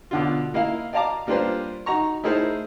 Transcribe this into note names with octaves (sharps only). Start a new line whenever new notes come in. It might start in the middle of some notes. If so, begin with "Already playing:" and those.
B2 D3 F4
A#3 E4 D#5 F5
D5 D#5 F5 A5 A#5 D6
G3 A#3 D4 F4 B4 C5
D#4 F#4 A#5 C#6
A3 D#4 E4 G#4 A#4 C5